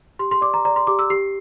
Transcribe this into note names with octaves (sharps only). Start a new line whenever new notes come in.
G4 C6
C6
D5 D6
A#5
D5 A#5
C6
G4 D6
E6
G4 C7